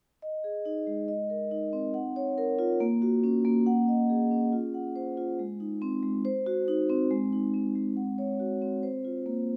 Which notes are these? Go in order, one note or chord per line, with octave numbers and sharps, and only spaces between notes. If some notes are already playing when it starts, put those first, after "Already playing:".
D#5
G#4
D#4
G#3
D#5
A#4
D#4
C4
F#5
C#5
A#4
F4
A#3
F#4
C#4
A#3
F#5
D#5
G#4
C#4
F4
F#5
C5
F4
G#3
D#4
C4
G#3
C5
F#4
D#4
C4
G#3
D#4
C4
G#3
F#5
C#5
F#4
C4
C5
F4
A#3